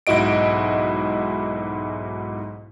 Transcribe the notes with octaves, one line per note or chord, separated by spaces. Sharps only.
B1 G#2 E4 F#4 D#5 D7